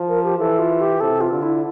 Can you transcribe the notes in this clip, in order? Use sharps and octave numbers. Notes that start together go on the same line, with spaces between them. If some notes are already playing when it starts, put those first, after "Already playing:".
Already playing: F3
A#4
G4
E3 A4
F4
G4
C3 A4
F4
D3
E4